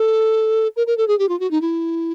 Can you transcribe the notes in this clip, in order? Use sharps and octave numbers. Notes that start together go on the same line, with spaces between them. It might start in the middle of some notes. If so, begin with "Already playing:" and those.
Already playing: A4
A#4
A#4
A4
G#4
G4
F4
F#4
D#4
E4